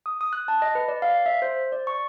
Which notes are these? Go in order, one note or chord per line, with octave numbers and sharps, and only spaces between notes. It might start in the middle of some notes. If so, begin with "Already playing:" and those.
D#6
D#6
F#6
A5
D#5
B4
D5
F5
E5
C5
D5
C#6